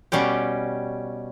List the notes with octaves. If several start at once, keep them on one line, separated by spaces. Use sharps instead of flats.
B2 G3 C#4 G4